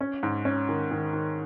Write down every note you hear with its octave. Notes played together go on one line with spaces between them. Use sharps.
C#4
G#2
C#4
D#3
D#3
D#3